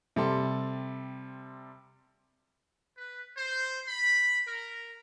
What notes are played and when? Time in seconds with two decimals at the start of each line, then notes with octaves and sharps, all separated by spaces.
0.16 C3 G3 A4 C6
2.98 B4
3.37 C5
3.88 B5
4.46 A#4